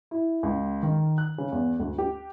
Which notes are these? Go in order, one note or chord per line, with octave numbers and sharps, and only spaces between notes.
E4
C#2
D#3
F#6
C#3
E2
D2
G4